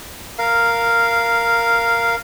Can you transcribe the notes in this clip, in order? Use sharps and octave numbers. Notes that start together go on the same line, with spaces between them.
A#4 F5